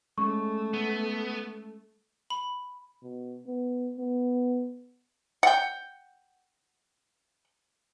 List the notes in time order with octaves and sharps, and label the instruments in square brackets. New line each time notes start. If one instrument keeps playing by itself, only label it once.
[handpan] G#3 C#4 [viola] A3 [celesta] C#6
[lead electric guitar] B3
[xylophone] B5
[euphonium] B2
B3
B3
[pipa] F#5 G5